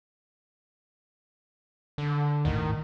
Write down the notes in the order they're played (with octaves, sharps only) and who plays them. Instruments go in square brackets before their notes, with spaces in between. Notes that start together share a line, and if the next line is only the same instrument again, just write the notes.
[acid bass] D3
[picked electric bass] D#1 G#1 A2 [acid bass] D#3